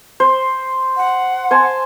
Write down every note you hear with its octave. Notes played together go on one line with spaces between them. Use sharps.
C5
F#5
C5 G#5 A5